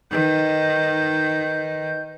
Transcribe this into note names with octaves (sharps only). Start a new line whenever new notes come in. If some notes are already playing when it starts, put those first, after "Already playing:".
D#3 D#4 B4 D#5 G6